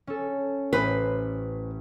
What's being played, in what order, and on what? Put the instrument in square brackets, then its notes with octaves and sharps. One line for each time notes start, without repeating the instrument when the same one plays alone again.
[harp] C#4 A4
[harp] A1 [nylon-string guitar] B4 C5